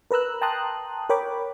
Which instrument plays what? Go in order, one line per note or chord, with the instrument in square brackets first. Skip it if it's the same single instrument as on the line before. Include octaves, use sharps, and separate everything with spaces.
[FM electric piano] A#4 B4 A#5 E6 F#6
G5 A5 A#5 C6 D#6 F#6
A#4 C#5 G5 B5 D6